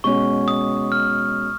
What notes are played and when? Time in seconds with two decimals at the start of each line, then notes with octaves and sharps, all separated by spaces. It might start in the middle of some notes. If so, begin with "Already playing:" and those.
0.04 B2 G#3 C#4 F#4 C#6
0.48 D#6
0.92 F6